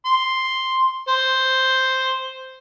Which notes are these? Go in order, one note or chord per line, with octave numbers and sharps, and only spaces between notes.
C6
C5